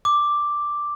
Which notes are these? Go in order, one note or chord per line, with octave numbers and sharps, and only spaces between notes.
D6